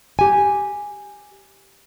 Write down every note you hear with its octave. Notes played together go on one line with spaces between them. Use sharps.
G4 G#5